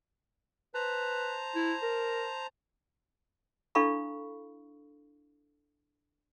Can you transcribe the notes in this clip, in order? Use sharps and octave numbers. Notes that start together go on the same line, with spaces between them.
B4 C5 A5 A#5
E4
A#4
D4 E4 A4 F5 B5 C#6